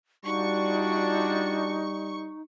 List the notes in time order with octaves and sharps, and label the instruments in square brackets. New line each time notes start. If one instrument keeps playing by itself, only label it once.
[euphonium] G3 [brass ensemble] D4 F4 F#4 [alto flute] D#4 [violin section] C#6